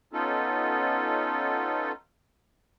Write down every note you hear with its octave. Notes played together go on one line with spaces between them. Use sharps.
B3 C#4 D#4 F4 A4